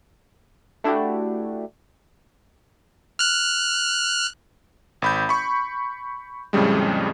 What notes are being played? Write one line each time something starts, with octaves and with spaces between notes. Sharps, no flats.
A3 D4 E4 F#4 G4
F6 F#6
G#1 B5 G6
B5 C#6
F2 A2 C#3 G3 G#3